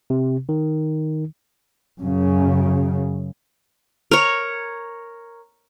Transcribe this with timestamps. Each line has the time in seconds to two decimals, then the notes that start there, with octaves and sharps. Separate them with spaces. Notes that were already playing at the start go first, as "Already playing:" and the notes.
0.10 C3
0.49 D#3
2.01 F#2 C#3
4.11 A#4 C#5